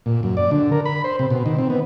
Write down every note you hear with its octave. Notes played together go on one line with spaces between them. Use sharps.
A#2
F#2
D5
D3
A#4
B5
C5
C3
B2
D#3
C4
B3